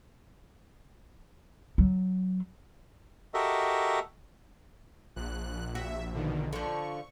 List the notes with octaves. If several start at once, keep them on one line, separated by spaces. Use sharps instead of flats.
F#3
F#4 G4 A4 A#4 D#5 E5
A#1 F#6
F#4 E5
B2 D3 D#3
D3 F3 C#6